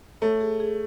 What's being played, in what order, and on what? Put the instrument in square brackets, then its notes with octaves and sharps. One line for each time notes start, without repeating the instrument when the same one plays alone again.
[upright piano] A3 [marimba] C#5
[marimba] G#4
G#4